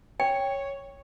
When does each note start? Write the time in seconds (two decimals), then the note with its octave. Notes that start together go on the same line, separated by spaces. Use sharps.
0.20 C#5 G5